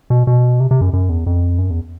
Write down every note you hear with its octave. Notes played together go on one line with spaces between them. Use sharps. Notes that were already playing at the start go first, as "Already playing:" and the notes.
B2
B2
C3
C3
F#2
F#2
E2
F2
F#2
E2